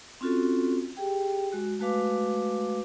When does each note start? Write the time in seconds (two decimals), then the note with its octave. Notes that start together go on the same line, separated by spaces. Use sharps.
0.21 C4 C#4 F4 F#4 A4
0.97 G4 G#4 G5
1.52 G#3 F#4
1.79 G#3 A3 F#4 B4 F5 D6